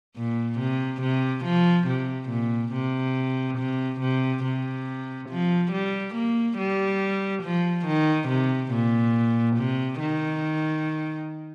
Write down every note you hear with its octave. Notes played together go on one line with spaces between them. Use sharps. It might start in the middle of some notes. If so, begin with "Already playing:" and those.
A#2
C3
C3
F3
C3
A#2
C3
C3
C3
C3
F3
G3
A#3
G3
F3
D#3
C3
A#2
C3
D#3